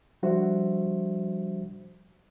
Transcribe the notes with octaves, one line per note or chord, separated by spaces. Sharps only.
F3 G3 D4 F#4 C5 E5